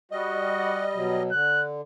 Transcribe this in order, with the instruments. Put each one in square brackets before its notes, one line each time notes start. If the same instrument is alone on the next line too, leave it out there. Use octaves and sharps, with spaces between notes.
[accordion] G3 D#5 [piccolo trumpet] F#4
[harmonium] D5 F#5
B2 F#3
[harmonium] D3 [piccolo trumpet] F#6